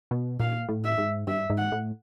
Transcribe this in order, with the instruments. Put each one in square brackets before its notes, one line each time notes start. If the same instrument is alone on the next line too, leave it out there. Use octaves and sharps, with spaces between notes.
[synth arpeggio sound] B2
[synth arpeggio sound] A#2 [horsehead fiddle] F5
[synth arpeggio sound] A2
[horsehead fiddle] E5
[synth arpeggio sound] G#2
[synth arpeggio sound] G2 [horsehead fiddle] E5
[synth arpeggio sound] G#2
[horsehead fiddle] F#5
[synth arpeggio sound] A2